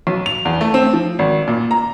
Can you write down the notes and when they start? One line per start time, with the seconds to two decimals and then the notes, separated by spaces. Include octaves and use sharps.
0.07 B1
0.26 F7
0.45 E2
0.61 A3
0.74 C4
0.93 F3
1.19 G#1
1.48 A#2
1.71 A#5